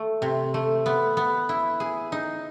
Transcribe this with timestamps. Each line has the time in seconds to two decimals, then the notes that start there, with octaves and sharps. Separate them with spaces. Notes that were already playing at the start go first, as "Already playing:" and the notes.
Already playing: A3
0.22 C3
0.54 A3
0.86 B3
1.17 B3
1.49 E4
1.80 G#4
2.12 D#4